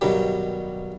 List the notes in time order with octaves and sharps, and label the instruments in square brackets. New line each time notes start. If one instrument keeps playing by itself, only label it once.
[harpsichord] G2 B2 D#3 F#3 G3